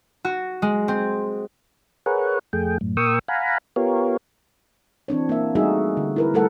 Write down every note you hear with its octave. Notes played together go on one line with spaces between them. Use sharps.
F#4
G#3
C4
G#4 A#4 B4 C#5 F#5
F2 A3 G#4 G5
F#2 A2
A#2 A#4 G5 C#6 D#6 E6
F5 F#5 G#5 A#5 B5
B3 F4 G4 A#4 C#5
E3 C4 D4 C#5
A#3 E5
G3 A3 D#4 F#4 G#4 E5
D3
E4 A#4 B4
G3 A3 A4 A#4 F#5